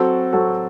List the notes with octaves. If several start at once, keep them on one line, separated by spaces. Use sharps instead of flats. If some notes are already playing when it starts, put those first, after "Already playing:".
Already playing: F#3 C4 F#4 A4
F#3 C4 F#4 A4